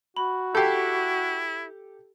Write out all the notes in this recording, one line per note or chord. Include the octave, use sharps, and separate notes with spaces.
F#4 B5
E4 G4 A4 G6 C7